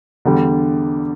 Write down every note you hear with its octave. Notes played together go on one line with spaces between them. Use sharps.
E2 D3 G3